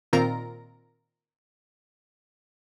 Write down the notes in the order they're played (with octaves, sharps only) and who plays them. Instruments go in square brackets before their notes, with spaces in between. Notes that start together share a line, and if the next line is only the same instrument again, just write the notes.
[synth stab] A#2 D#3 C4 F4 A#4 A#5